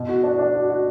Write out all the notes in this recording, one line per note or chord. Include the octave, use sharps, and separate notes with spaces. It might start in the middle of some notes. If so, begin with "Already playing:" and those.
Already playing: B2
F#4
D4
D4
F#4
F#4